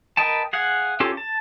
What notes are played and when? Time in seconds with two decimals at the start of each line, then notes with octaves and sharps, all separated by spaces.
0.17 A#4 B4 D#5 G5 A5
0.53 G#4 F5 F#5
1.00 C#4 F4 G4 A4
1.17 A5